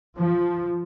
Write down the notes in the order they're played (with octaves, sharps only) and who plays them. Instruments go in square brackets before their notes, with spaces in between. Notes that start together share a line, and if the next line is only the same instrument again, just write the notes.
[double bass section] F3